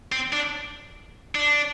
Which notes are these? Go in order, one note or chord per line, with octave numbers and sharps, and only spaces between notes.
C4
D4
D4